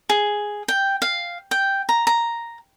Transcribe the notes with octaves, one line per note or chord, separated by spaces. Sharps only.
G#4
G5
F5
G5
A#5
A#5